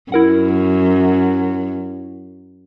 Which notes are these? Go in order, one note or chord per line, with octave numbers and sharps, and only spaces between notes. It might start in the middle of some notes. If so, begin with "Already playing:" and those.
F#2 E4 A#4 F#5